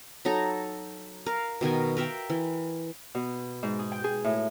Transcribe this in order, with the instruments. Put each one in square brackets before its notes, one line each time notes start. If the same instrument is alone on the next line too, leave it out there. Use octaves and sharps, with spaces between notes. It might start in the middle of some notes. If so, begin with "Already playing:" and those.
[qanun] F#3 D#4 A4 A#5
A#4 F5
B2 D#3 A#4 G#5
A#4 E5 F5 G5
E3
[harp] B2
G#2
G#4
G5
G#4
A2